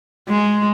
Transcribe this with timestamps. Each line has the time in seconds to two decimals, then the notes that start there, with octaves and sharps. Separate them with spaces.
0.29 G#3